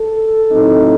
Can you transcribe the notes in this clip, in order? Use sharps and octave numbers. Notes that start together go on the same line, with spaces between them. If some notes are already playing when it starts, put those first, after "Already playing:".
Already playing: A4
A2 F#3 C4 D#4